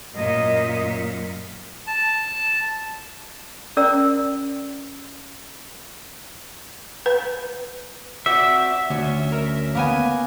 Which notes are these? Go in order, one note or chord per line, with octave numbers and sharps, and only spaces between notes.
F#2 A#2 D#5
A5
C#4 A#4 D5 A#5 E6
B4
C4 F#4 D5 E5
D2 C#4
A#4
A#3 B3 G#5